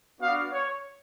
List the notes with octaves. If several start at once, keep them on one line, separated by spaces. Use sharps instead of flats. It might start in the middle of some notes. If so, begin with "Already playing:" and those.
B3 D4 F#4 F5
C#5